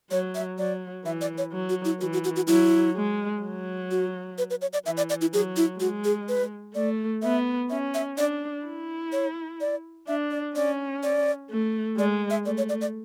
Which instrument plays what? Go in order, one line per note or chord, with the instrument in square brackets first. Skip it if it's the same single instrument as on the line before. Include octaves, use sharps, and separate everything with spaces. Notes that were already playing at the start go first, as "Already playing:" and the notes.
[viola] F#3 [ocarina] C#5
[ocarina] E5
[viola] F#3 [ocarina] D5
[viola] E3 [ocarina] E5
[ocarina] D5
C#5
[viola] F#3
[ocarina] F#4
E4
[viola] E3 [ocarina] F#4
[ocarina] F#4
F#4
F#4
[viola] F#3 [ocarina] E4
[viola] G#3
F#3
[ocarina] F#4
B4
B4
C#5
D5
[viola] E3 [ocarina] E5
[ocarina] D5
D5
E4
[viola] F#3 [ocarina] G#4
[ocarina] E4
[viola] G#3 [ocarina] F#4
[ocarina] G#4
B4
[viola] A3 [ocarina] D5
[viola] B3 [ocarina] E5
[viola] C#4 [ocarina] E5
[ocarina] E5
[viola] D4 [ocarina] D5
[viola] E4
[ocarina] C#5
D5
[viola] D4 [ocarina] E5
[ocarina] D5
[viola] C#4 [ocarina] D5
[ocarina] D5
[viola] A3
[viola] G#3 [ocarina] D5
[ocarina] E5
[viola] A3 [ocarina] D5
[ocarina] C#5
D5
D5